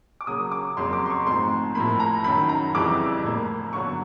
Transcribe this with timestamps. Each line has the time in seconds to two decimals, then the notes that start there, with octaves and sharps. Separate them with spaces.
0.21 D6
0.27 C#3 F#3 A#3 D#6
0.52 D6
0.77 F2 C#3 F#3 A#3 C6
0.93 D6
1.06 C6
1.10 C#6
1.26 G#2 F3 A3 C4 C6
1.75 A2 F3 A#3 B5
2.00 A#5
2.24 F#2 D#3 F#3 B5
2.49 A#5
2.75 F2 C#3 E3 G3 D6
3.23 A2 F3 A#3
3.73 G2 D3 F#3 B3 C#6